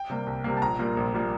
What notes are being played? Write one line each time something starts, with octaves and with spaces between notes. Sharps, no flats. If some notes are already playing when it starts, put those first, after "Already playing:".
Already playing: G5
C3 G3 A#3
C2
C3 G3 A#3
A5
A#1 A#5
A#2 G3 A#3
A#1
A#2 G3 A#3